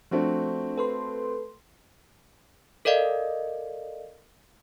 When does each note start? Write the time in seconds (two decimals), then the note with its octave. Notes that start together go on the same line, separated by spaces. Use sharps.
0.11 F3 A3 C4 D4 F#4
0.78 A4 B4 C6
2.85 A4 A#4 D5 D#5 F5